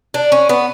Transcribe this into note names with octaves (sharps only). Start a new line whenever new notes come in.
D4
C#4
B3